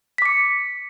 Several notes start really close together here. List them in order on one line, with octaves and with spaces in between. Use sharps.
B6 D6 C#7